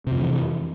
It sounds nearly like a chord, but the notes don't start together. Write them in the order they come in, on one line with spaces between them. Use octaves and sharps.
C3 F2 F3 E3